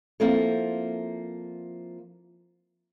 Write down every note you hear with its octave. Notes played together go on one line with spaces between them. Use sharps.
F3 A#3 C4 E4 A4